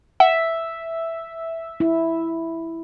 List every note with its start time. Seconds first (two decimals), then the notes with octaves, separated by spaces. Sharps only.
0.20 E5 F#5
1.80 E4